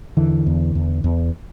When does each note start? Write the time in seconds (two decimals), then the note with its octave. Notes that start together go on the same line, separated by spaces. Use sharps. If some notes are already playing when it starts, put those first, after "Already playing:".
0.17 E2 D3 E3
0.47 E2
0.75 E2
1.04 E2